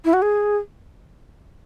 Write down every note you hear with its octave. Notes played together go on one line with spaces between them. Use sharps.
E4
F#4
G#4